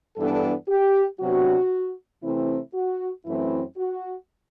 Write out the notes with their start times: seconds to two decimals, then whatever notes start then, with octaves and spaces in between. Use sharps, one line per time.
0.17 G2 E3 B3 D4 A4
0.69 G4
1.20 C3 F#3 B3 D4 F#4
2.23 C3 E3 A3 C4 E4
2.74 F#4
3.26 F#2 E3 A3 C4 E4
3.77 F#4